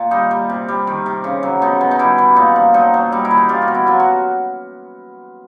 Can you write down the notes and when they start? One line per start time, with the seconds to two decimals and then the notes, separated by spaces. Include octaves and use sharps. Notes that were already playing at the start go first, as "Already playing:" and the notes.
Already playing: A#2
0.11 G3 D#4
0.31 G3
0.50 C3
0.68 G3
0.87 D#3
1.06 C3
1.24 C#3
1.43 F#3
1.62 B2 D#4
1.81 B2
1.91 D#4
1.99 G3 E4
2.18 E3
2.36 A#2 D#4
2.56 F3
2.74 F#3 D#4
2.94 F#3
3.12 G3 D#4
3.25 E4
3.31 E3
3.37 D#4
3.49 G3 F4
3.62 F#4
3.68 B2
3.74 E4
3.87 F#3 F4
4.00 F#4